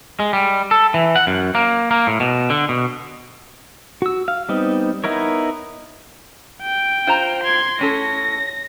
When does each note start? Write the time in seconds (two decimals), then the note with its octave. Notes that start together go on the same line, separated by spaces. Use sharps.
0.20 G#3
0.33 G3
0.71 A4
0.94 E3
1.16 F#5
1.27 F#2
1.55 A#3
1.91 A#3
2.07 A2
2.20 B2
2.50 D3
2.69 B2
4.02 F#4 E6
4.28 F5
4.49 G3 B3 C4 D#4
5.04 B3 D#4 E4 A#4 C#5
6.62 G5
7.07 F4 C5 A#5
7.43 C6 G#6
7.79 A2 C#4 A4 A#6